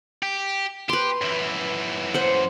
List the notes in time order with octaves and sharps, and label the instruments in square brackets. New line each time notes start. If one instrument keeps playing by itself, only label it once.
[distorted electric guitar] G4
[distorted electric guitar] G4 [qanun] B4 C6
[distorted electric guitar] F#2 E3
[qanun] C5 F#5